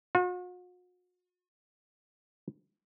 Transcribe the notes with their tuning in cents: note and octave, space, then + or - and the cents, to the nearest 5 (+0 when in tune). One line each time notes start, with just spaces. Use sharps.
F#4 -45